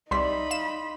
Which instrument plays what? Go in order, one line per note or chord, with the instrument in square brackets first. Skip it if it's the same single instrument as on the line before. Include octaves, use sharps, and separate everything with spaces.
[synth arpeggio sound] C2 G3 B6 [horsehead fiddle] D#4 B5 [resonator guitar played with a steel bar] D5 E5 [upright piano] C6
[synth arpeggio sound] F5 E7